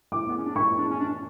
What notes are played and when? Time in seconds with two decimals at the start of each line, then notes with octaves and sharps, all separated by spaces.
0.12 D6
0.28 B3
0.37 C#4
0.46 D4
0.56 E4 C#6
0.78 D4
0.90 C#4
1.00 D4